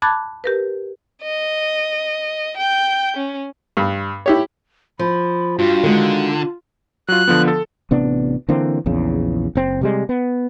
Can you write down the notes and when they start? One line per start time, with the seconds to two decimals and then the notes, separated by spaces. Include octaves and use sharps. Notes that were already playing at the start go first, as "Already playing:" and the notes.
0.02 A5 B5 D6 F#6 G#6 A6
0.44 G4 A#4 B4
1.22 D#5
2.57 G5 G6
3.16 C#4
3.77 G2
4.26 E4 G4 C#5
4.99 F3 B5
5.59 G2 F4 F#4
5.83 D3 D#3 G#3
7.08 F#3 F4 F#6
7.28 D3 F3 B3
7.48 A4
7.91 A1 C3 B3 D4
8.49 D3 E3 A#3 C4
8.86 A#1 E2 C#3
9.55 F#1 C4
9.81 C3 G3 G#3
10.09 B3